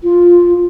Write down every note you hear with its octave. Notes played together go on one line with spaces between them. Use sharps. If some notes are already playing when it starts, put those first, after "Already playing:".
F4